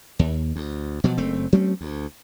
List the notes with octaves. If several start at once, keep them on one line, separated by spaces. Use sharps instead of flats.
D#2
D2
B2 F3 F#3
F#1 A3 C4
F#3 A3 C4 C#4
D2